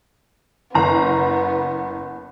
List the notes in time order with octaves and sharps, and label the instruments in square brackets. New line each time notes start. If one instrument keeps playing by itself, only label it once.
[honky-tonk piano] F#1 A#5 C6 [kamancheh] B3